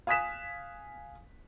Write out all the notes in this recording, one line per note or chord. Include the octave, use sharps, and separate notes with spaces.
F5 G#5 D#6 F#6 B6 E7